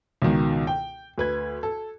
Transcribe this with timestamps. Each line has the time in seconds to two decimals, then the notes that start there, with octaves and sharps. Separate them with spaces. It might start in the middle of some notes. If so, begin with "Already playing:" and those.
0.22 C#2 B2 D#3
0.67 G5
1.18 D2 B4 G#6
1.63 A4